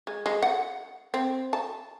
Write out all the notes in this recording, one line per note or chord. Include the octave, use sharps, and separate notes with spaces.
G#3
G#3
F#5
C4
A5